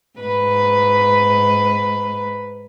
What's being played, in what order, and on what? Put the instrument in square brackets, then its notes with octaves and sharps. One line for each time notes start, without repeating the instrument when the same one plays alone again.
[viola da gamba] G#2 B4